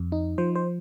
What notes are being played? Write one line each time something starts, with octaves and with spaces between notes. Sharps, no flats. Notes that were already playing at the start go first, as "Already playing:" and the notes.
Already playing: F2
D#4
F3 C5
C5